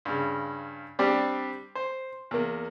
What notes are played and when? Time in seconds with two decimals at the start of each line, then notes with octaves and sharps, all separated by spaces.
0.05 G2 C#3
0.99 G3 C4 D4 G4
1.75 C5
2.31 E2 A#3